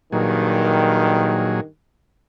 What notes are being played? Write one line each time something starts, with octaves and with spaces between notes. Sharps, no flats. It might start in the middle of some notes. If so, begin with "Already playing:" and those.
G2 A#2 D#3 F#3 G#4